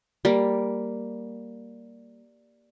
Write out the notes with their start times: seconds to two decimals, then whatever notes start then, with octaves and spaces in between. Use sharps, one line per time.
0.25 G3 A#3